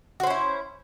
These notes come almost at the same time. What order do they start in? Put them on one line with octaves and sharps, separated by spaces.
F#4 C5 C#4 E4